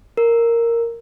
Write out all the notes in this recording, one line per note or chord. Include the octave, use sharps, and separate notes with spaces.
A#4